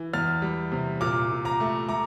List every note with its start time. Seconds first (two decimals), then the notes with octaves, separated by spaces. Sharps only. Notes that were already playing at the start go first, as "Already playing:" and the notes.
Already playing: E3
0.13 E2 F6 A6
0.42 G3
0.72 C3
1.01 A#2 D6 F6
1.31 A#2
1.45 A#5 D6
1.60 A3
1.89 A3 A#5 D6